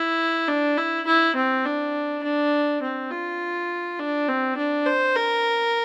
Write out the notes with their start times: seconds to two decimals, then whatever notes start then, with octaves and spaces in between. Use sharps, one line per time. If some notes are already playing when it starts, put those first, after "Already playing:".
Already playing: E4
0.48 D4
0.77 E4
1.07 E4
1.36 C4
1.65 D4
2.23 D4
2.82 C4
3.10 F4
3.99 D4
4.28 C4
4.57 D4
4.86 C5
5.15 A#4